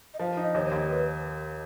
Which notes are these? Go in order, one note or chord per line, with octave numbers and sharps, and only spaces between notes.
D#5
F3 F5
D#4
D#5
D#2 C#5
D#2
B4